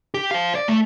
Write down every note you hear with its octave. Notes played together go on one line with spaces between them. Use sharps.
G4
C5 F5
D5
A3